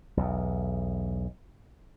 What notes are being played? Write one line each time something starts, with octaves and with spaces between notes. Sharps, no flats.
B1 E2